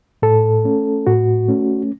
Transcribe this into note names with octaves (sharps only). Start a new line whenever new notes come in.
A2 A4
A3 C#4
A2 F#4
A3 C#4